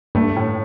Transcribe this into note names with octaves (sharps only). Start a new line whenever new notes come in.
G2 A3
A2